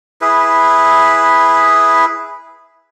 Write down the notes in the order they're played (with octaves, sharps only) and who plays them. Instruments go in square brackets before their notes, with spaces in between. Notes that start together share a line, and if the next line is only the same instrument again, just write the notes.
[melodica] E4 G#4 B4